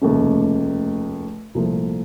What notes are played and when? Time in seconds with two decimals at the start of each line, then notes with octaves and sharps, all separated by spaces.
0.01 F1 D#2 C#3 A3 C#4
1.55 C2 A#2 F3 A3